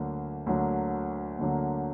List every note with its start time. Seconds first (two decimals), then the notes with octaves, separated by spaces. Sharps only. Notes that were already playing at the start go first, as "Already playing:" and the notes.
Already playing: D2 D3 F#3 A#3
0.46 D2 D3 F#3 A#3
1.39 D2 D3 F#3 A#3